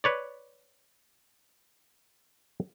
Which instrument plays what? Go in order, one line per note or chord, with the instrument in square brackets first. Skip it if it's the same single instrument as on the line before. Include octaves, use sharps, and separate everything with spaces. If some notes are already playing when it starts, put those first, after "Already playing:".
[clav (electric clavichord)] B4 C#5 D5